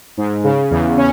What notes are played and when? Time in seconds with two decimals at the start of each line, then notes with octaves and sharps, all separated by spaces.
0.17 G#2
0.44 C#3
0.71 E2
0.97 C#4